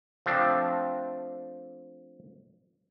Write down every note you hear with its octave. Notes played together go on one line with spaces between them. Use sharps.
F3 A3 C4 D4